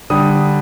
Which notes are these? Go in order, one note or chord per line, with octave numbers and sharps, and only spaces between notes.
D3 G3 D#6